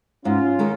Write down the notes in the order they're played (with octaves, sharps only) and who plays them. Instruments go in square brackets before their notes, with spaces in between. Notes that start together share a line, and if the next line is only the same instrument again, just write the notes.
[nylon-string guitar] G#2 [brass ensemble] C#4 F4
[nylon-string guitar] D#3 G#3 D#4